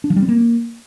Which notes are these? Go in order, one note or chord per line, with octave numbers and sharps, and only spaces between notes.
D4
F3
G3
C4
A#3